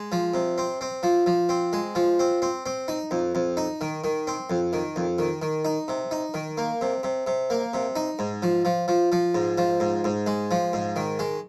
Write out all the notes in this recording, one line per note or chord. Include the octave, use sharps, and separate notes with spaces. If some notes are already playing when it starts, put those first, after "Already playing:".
Already playing: G#3
F3
C3
C4
C4
F3
F3
C4
G#3
F3
C4
C4
C4
D#4
F2
F2
D#4
D#3
D#3
C4
F2
D#3
F2
D#3
D#3
D#4
C3
D#4
D#3
A#3
C3
C3
C3
A#3
C3
D#4
G#2
F3
F3
F3
F3
G#2
F3
G#2
G#2
G#3
F3
G#2
D#3
G#3